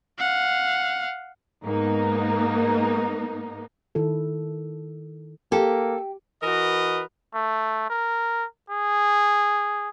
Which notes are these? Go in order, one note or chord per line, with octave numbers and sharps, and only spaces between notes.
F5 F#5
G#2 A#3 B3 D#4
D#3 E4 A4
A#3 G4 A4
E3 F#4 A#4 B4 D#5
A3
A#4
G#4